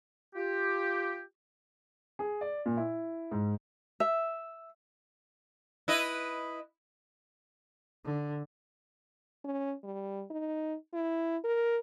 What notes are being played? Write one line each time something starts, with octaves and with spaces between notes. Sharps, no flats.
F4 G4
G#4
D5
A#2
E4
G#2
E5
E4 B4 D#5
D3
C#4
G3
D#4
E4
A#4